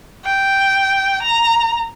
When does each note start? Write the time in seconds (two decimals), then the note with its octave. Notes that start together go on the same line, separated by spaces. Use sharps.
0.25 G5
1.22 A#5